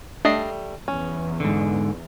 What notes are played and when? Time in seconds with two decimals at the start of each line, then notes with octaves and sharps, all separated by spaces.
0.25 G3 A3 D4 D#5 C7
0.88 E2 C#4
1.40 G#2 D3